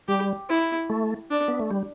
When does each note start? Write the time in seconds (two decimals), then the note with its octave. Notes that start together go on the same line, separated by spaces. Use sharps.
0.08 G3 G4
0.50 E4
0.90 A3
1.30 D4
1.48 B3
1.59 A3
1.70 G3